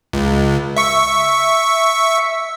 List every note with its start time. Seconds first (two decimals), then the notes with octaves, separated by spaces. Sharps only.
0.13 C#2
0.77 E5 C#6